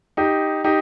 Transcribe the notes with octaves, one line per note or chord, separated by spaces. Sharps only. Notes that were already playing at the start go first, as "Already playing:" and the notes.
D#4 G4
D#4 G4